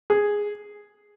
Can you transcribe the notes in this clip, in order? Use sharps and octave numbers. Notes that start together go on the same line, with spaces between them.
G#4